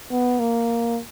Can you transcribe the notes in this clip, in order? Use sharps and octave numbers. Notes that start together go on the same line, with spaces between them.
B3
A#3